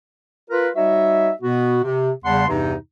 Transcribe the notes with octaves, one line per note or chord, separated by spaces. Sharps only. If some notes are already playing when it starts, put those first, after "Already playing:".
F4 A#4 B4
G3 D#4 F#4 C#5 D#5 E5
B2 B3 F#4
C3
E2 C#3 G3 F#5 A5 C6
E2 G2 C3 E3 D#4